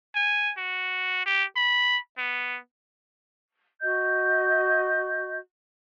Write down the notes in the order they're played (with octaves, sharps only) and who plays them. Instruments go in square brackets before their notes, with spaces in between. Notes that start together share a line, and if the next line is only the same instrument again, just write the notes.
[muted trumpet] G#5
F#4
G4
B5
B3
[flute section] F#4 D#5 G6